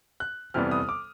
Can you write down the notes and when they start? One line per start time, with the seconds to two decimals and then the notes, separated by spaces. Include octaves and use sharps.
0.20 F#6
0.54 F2 C3 E3 G3 B3 F6
0.71 D#6
0.89 D6